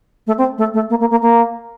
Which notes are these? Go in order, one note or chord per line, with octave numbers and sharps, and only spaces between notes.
A3
C4
A3
A3
A#3
A#3
A#3
A#3